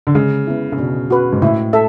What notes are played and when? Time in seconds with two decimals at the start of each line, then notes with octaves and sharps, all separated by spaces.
0.07 D3
0.15 C#3 G#3
0.47 B3 E4
0.72 C#3
0.78 B2 D4
1.10 F#4 B4
1.32 G#2
1.42 A2 E4
1.73 A4 E5